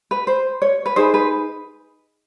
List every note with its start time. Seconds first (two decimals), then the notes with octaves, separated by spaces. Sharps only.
0.11 B4
0.27 C5
0.62 C#5
0.86 B4
0.96 D#4 G#4 B4 C5
1.14 B4